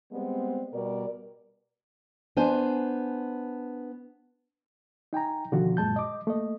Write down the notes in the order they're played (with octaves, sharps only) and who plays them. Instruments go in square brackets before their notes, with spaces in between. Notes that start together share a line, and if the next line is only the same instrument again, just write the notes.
[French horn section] G3 G#3 B3 C4
B2 G3 A#4 D5
[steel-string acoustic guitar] B3 D4 C5 G#5
[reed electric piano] D#4 G5 G#5 A#5
B2 D3 D#3 F3 F4 F#4
F#2 A#2 G#3 A5 G6
D#5 D6
A3 A#3 D#5